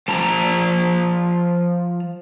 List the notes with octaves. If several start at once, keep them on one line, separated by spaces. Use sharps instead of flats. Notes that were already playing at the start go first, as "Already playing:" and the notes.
F3 A5 A#5